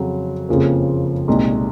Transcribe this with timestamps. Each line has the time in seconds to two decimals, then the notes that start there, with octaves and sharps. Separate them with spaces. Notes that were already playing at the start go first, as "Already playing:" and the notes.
Already playing: F2 C#3 F#3
0.49 F#1 F2 C#3 F3 A#3
1.28 C2 A#2 G#3 D#4